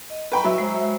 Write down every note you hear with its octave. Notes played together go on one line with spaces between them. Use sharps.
D#5
B4 G5 A#5 B5 C#6
F#3 E5
G#3 C5